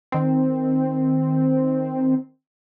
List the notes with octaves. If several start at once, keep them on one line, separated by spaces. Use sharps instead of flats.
D#3 C4